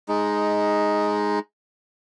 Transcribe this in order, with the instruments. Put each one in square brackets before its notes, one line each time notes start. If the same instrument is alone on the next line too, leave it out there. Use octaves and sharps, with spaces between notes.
[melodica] G#3 D#4